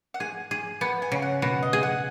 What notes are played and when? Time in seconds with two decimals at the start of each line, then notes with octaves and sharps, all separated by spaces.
0.14 F#5
0.20 G#4 G#5
0.51 G#4
0.81 B3 F#5
1.02 G#5
1.12 C#3
1.22 F#5
1.42 B2 F#5
1.63 D#5
1.73 G#4
1.83 F#5